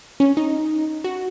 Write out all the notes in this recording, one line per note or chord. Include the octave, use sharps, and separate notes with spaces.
C#4
D#4
F#4